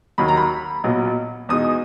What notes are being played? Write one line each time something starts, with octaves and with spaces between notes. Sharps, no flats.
D#2 D#3 F#3 B5
A#5
B5
B1 A#2 F#3 B3
E2 B2 G#3 D#4 D#6